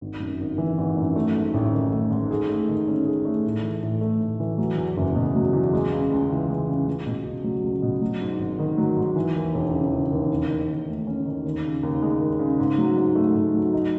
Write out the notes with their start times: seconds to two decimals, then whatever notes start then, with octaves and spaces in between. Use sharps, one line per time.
0.01 G#1
0.20 F#2
0.40 G#1
0.58 E3
0.78 G#1
0.97 F#2
1.16 A3
1.35 G#2
1.54 A1
1.73 D#3
1.92 A3
2.11 G#2
2.30 G#4
2.49 A3
2.69 D#3
2.87 C#4
3.06 G#4
3.25 A3
3.45 A2
3.63 E3
3.83 A2
4.01 A3
4.21 A2
4.40 E3
4.58 F#3
4.77 E2
4.97 F#1
5.15 B2
5.35 F#3
5.53 E2
5.73 G#3
5.92 C#3
6.12 C#2
6.30 E3
6.49 G#3
6.68 C#3
6.87 C#2
7.06 B2
7.25 C#2
7.44 F#3
7.63 C#2
7.82 B2
8.01 F#3
8.21 G#2
8.39 G#1
8.59 D#3
8.77 F#3
8.96 G#2
9.16 E3
9.35 D#2
9.54 E1
9.73 C#3
9.92 E3
10.11 D#2
10.31 C#4
10.50 D#3
10.69 D#2
10.87 A3
11.07 C#4
11.25 D#3
11.45 D#2
11.64 C#3
11.83 D#2
12.02 G#3
12.21 D#2
12.39 C#3
12.59 G#2
12.78 F#3
12.97 G#2
13.15 A3
13.35 G#2
13.54 F#3
13.73 D#4